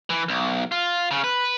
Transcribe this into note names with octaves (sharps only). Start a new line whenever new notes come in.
E3
B1
F4
C#3
B4